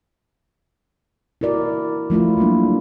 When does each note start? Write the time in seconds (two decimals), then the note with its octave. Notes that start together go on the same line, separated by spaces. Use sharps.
1.41 E4 F#4 A#4 D5
2.10 F3 A3 E4 F4
2.37 F#3 G3 A#3 D4